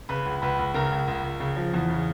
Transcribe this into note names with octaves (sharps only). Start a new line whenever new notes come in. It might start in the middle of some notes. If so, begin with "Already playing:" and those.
C#3 B4 B5
C#2
C#2 B4 B5
C#2
C#3 A#4 A#5
C#2
C#2
C#2
C#3
F3
E2
C#3